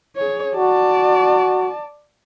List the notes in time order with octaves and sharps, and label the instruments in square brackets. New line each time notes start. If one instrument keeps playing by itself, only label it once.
[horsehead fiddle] G#4 C#5
[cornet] F#4 [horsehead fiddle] D5 A5